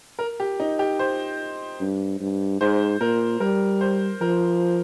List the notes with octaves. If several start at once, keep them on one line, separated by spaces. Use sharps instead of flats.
A#4
G4
D#4
G4
C5
G2
G2
G#2 C5
A#2 A#4
G3 A#4
C5
F3 A#4